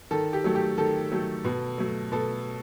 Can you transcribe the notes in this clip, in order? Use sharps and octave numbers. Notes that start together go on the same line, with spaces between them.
D#3 A4
G4
F#3 A3
G4
D#3 A4
F#3 A3
B2
F#3 A3
B2 A4